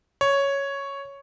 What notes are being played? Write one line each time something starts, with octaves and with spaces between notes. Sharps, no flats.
C#5